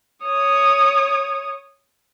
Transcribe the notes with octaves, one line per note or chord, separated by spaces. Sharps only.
C#5 D#6